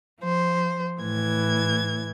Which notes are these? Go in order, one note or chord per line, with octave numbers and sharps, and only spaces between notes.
F3 C5
A2 E3 G#6